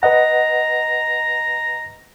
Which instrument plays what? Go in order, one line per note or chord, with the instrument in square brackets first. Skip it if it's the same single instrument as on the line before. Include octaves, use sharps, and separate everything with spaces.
[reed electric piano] B4 D#5 F#5 [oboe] A#5